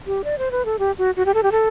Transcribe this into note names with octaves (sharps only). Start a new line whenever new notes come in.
G4
D5
C5
B4
A4
G4
F#4
F#4
G4
A4
G4
A4